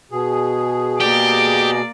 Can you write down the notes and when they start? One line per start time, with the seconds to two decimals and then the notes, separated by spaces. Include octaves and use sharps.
0.11 B2 G#4
1.00 A#3 G4 D5